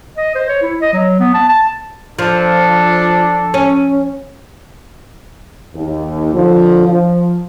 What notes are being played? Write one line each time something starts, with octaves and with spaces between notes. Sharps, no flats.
D#5
C5
C#5
E4
D#5
F#3
B3
A5
A5
F3 D4 A4
C#4
D#2
D3 F3
F3